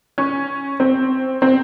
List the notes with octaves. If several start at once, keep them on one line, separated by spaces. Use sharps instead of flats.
C#4
C4
C4